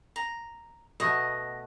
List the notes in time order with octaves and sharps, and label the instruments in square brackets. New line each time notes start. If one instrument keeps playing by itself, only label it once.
[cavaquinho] A#5
[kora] B2 A3 B3 [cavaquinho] D#5